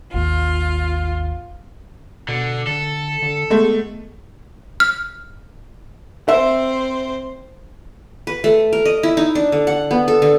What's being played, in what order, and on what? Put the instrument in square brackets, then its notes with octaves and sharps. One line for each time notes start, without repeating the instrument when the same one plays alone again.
[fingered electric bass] G#1 D#2 [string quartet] F4
[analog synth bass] B2 [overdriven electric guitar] D3
[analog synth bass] D3 [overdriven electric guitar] A4
[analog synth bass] D3
[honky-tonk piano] G#3 A3 [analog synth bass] B3
[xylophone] F6
[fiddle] C4 C5 [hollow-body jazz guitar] E5
[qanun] B4
A3
A#4
D#5
E4
D#4
D4
D3
F#5
B3
A4
D3